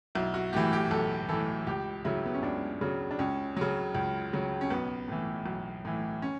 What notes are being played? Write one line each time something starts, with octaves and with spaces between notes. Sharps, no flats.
B1 E4
F#4
A2 E3 G4
G4
B1 A4
A2 E3 A4
C#2 G4
C#3 F#3 E4
B3
C#4
C#2 D4
C#3 F#3
D4
C#2 C#4
C#3 F#3
C#2
C#3 F#3
C#4
B1 B3
A2 E3
B1
A2 E3
C#4